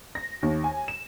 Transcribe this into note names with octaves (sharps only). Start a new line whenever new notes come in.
A#6
D#2
G#5
E7